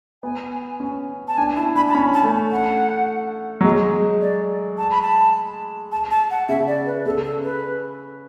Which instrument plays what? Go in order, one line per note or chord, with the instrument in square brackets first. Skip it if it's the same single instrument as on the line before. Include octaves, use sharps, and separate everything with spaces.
[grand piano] B3 [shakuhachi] G#5
[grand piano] C#4
[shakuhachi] A5
[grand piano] D4 [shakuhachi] G#5
[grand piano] E4 [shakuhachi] A5
[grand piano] D4 [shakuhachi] B5
[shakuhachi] A5
[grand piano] C#4 [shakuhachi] B5
[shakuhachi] A5
[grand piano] A3
[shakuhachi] F#5
[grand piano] F#3
G#3
[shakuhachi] D5
A5
B5
A5
A5
A5
F#5
[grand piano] C#3 [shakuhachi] E5
[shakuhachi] D5
B4
[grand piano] C#3 [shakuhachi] A4
[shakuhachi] A4
B4